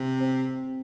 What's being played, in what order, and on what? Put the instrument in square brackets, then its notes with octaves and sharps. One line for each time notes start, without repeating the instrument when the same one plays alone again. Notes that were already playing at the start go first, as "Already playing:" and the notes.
Already playing: [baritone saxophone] C3 [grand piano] C4
[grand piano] C4